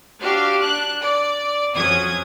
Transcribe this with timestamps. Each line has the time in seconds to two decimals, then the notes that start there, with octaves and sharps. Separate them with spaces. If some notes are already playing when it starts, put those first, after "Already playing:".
0.20 D4 F#4 G4 F5
0.61 D4 F#6
1.01 D5
1.75 F2 F#3 C#4 D#6 G#6